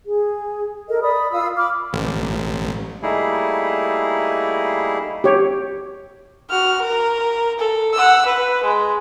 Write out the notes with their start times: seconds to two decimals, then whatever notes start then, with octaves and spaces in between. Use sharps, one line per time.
0.06 G#4
0.89 A4 A#4 D#5
1.01 D5 B5 D#6
1.32 F4 F5 D#6 E6
1.56 B5 D6 F6
1.93 A1
3.03 G3 A3 A#3 D#4 E4 G#4
5.24 G4 C#5
6.50 F#4 F6
6.81 A#4
7.60 A4
7.94 F#5 E6
8.26 B4
8.64 G#3